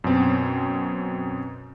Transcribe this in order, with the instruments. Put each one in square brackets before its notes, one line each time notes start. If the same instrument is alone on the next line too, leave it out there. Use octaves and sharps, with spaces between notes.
[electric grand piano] F#2 B2 C4